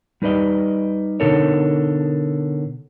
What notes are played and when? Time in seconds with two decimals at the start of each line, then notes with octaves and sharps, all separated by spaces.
0.22 G3 D#4 B4 D5 D#5
1.20 B2 D3 D#4 A4 A#4 C#5